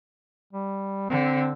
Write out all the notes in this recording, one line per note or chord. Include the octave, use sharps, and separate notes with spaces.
G3
D3 C4